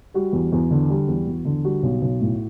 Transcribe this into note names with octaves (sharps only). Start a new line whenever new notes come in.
G3 F#4
E2
E2
D3
G3
E2
E2
D3
G3 F#4
B1
B1
A2